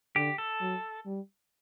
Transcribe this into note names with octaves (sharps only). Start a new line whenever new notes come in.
D3 G4
A4
F#3
G3